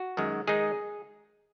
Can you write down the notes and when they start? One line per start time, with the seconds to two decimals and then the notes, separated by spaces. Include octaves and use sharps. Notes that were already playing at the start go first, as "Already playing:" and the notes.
Already playing: F#4
0.17 F#2 D#3 G#3
0.47 D#3 G#3 D#4 G#4